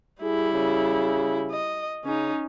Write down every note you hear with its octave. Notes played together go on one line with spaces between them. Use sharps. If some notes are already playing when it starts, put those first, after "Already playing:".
G3 E4 G#4
C#3
D#5
C#3 C#4 D#4